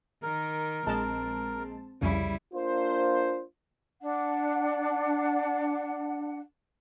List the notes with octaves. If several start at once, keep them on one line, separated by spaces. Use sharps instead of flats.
D#3 A#4
A#1 G#3 C4 A5
C2 F2 C#3 G3 E4
A#3 D4 F4 C5
D4 F#5